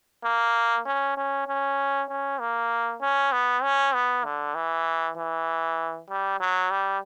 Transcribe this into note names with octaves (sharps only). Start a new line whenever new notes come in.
A#3
C#4
C#4
C#4
C#4
A#3
C#4
B3
C#4
B3
D3
E3
E3
G3
F#3
G3